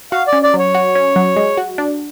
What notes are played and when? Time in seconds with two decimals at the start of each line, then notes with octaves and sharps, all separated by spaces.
0.12 F#4 F5
0.27 D5
0.33 C#4
0.43 D5
0.54 F#3
0.59 C#5
0.75 F#4
0.95 C#4
1.16 F#3
1.36 G#3
1.57 F#4
1.78 D4